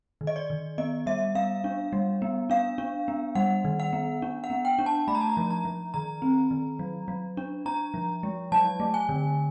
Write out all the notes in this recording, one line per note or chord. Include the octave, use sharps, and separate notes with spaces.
D#3
D#5
D5
D#3
B3 D#5
G3 E5
B3 F5
D4
G3
B3
D4 F5
D4
B3
G3 F#5
D#3
F#5
B3
D4
F#5
B3
G5
D4
A5
A3 B5
A#5
A5
A#5
F3
A#5
F3
D#3 A#5
C4
D#3
F#3
F#3
D4
D4 A#5
F3
G#3
F#3 A5
A3
G#5
D3